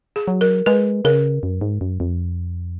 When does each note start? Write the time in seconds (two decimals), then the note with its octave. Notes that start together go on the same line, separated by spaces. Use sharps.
0.16 G#4
0.28 F#3
0.41 A#4
0.66 G#3 B4
1.05 C#3 A#4
1.43 F#2
1.61 G#2
1.81 F#2
2.00 F2